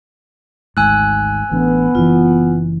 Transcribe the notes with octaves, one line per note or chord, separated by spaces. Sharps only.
G#1 D2 G#2 G#5 E6 F#6
A1 D3 B3
F#1 E3 F4